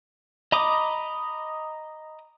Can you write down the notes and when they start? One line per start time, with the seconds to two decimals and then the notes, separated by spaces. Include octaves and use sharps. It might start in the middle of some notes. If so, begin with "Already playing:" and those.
0.52 D#5 A#5 B5 D6 D#6